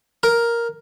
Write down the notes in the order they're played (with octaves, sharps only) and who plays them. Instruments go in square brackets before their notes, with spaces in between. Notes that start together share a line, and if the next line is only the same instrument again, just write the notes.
[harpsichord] A#4